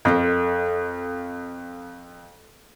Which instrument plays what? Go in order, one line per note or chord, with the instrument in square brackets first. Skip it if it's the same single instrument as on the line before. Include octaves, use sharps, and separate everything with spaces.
[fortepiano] F2 [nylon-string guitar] A4 A#4 D#5